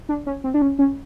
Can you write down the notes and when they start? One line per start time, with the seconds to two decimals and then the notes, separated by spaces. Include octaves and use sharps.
0.09 D4
0.26 C#4
0.44 C4
0.54 D4
0.62 C#4
0.79 C#4